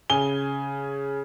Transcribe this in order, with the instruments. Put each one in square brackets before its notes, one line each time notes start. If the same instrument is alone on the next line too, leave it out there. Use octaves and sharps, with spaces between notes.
[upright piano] C#3 G#5 G7